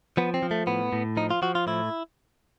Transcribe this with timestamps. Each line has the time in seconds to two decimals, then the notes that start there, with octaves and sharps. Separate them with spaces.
0.17 F3 B3
0.34 C4
0.43 F3
0.51 A3
0.67 A2 B3
0.93 A2
1.17 F3 D#4
1.31 F4
1.42 F3 F#4
1.55 F4
1.67 A2 E4